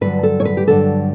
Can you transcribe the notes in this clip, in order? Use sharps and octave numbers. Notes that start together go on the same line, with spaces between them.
G2 D3 F#3 B4
A4
C#5
B4
G4
G2 D3 F#3 A4